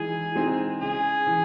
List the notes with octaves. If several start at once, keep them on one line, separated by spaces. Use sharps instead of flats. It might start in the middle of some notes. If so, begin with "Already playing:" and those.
Already playing: E3 G#3 D#4 G#4 G#5
G#3 C4 D#4
C#3 G#4 G#5
E3